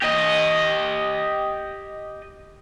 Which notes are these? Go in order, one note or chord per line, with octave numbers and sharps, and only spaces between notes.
G4 D#5